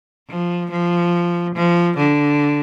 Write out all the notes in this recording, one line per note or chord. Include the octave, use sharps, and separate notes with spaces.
F3
F3
F3
D3